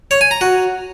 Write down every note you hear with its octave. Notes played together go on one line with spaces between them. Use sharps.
C#5
G#5
A#5
F#4